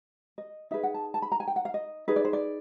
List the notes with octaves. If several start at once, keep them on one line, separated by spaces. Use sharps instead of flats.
D#5
D#4 G#4 B4 E5
F#5
A5
A5
B5
A#5
G#5
G5
F#5
F5
D#5
D#4 G#4 B4 D#5
D5
C5
D5